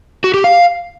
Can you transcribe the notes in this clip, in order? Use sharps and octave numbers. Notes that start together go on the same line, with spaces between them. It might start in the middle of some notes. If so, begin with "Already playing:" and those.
F#4
G4
F5